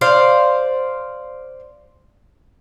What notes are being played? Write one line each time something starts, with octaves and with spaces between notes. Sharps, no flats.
C5 D5 F5